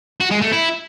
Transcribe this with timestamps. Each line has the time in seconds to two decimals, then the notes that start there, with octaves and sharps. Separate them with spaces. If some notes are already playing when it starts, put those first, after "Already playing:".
0.20 F#4
0.31 G#3
0.41 A3
0.52 E4